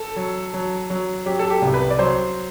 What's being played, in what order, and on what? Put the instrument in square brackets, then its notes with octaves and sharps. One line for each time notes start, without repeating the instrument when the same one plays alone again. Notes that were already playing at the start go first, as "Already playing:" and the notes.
Already playing: [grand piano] A4
F#3
F#3
F#3
F#3 G4
A4
G4
C2
B4
D5
F#3 C5